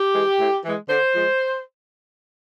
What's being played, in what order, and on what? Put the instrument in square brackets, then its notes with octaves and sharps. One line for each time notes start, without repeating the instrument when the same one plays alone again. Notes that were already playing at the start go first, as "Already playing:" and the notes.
Already playing: [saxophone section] G4
E3 G#3
A2
E3 G#3
D3 C5
F3 G#3